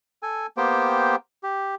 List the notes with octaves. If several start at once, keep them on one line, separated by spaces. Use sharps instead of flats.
A4 G#5
A#3 B3 G4 C5 G5
G4